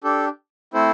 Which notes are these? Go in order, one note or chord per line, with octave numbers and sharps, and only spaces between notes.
D4 G4 A4
A3 C4 E4 A4 C5